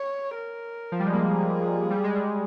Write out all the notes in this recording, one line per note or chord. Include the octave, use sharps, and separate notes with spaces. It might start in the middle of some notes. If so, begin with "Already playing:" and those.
Already playing: C#5
A#4
F3
G3
G#3
A#3 G#4
G3
G#3
G3